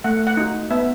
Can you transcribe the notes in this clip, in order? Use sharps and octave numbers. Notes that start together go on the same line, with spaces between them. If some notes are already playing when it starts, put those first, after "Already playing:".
A3 F#5
F#5
D#4 F#4
B3 E5